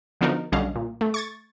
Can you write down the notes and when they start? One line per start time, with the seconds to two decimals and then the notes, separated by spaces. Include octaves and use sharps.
0.21 D3 F3 B3 D#4 F#4 A#4
0.52 B1 D3 G3 C#4 D#5 F5
0.76 A#2
1.01 A3
1.14 C#6 G#6 A6